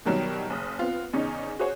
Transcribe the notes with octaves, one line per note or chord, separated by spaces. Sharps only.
B2 D#3 F#3 G3
F#1 D#6
B3 C4 F4
E2 C#3 C#4 D#4
F#4 G#4 C5 C#5